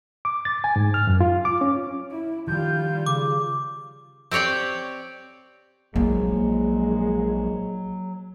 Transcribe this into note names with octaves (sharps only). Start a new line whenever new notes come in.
D6
A6
G#5
G#2
F6
F#2
F4
D6
C#4
E4
D#3 F3 G3 F4 G6
C#3 D6
C4 G4 C#5 D5 G5
A#1 F#3 G#3 A#3 E4